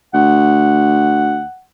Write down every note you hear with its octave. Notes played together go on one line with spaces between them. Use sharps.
D2 F#5